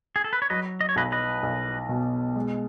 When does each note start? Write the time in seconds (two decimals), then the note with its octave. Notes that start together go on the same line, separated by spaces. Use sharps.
0.16 G#4
0.24 A4
0.33 B4
0.42 C#5
0.50 F#3 B4 D#5
0.81 D#5
0.89 C#5
0.96 B1 B4 D#5
1.12 B4 D#5
1.43 B1
1.89 B2
2.36 G#3